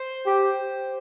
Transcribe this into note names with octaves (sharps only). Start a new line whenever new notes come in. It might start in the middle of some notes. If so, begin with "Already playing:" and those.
Already playing: C5
G4